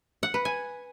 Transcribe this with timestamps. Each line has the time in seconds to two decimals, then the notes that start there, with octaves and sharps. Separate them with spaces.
0.23 F#5
0.34 B4
0.45 G#5